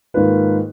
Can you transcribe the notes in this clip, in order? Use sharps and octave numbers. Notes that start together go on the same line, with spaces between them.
G#2 D#3 A#3 F4 B4